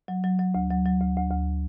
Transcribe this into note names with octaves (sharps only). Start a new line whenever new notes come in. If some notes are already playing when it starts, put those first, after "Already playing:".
F#3
F#3
F#3
D2
F#3
F#3
D2
D2
D2